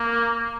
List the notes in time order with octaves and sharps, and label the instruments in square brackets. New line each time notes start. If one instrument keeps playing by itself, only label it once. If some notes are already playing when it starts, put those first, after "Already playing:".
Already playing: [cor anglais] A#3